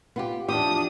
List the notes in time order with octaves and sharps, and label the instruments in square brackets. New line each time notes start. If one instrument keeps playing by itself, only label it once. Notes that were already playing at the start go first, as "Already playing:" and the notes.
[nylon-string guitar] B3 F4 G4
[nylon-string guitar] E2 F3 G4 [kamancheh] D4 D#6